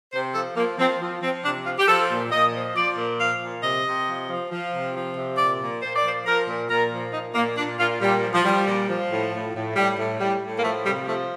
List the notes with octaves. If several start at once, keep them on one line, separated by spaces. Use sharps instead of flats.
C3 C5
F3 A4
F3 A#3
F3 C4
F3
F3 C4
C3 D4
F3 F4
G4
F3 A4
A#2
A#2 D#5
F3
F3 D5
A#2
F3 F5
A#2
C3 D#5
C3
F3
F3
F3
C3
F3
C3
A#2 D5
A#2
A#2 C5
D5
F3 C5
F3 A#4
A#2
A#2 A#4
F3
A#2 D#4
A#2 A#3
A#2 D4
A#2 F4
A#2 G3
F3
F3
F3 G3
A#2
F3
A2
A2
A2
A2 G3
A2
A2 G3
A2
A#3
F3 A3
C3 G3
F3 A3